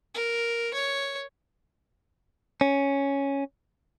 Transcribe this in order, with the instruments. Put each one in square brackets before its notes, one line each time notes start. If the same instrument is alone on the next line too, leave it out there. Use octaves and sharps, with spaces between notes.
[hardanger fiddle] A#4
C#5
[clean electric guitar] C#4